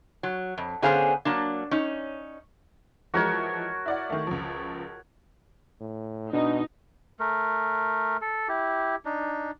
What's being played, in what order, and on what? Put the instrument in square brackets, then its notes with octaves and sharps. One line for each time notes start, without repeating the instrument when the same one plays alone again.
[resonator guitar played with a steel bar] F#3
F2
D3 B3 C#4 G#4 C5 F5
F#3 A#3 D4
C#4 D#4
[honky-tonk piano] E3 F3 G#3 [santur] F#4 A#4 C#5
[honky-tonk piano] E4 D5 F#5
D#3 A3
C#2 F3
[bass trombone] A2
[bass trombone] B2 [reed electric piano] D4 [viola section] D#4
[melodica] A3 A#4
A4
E4 G4
D4 D#4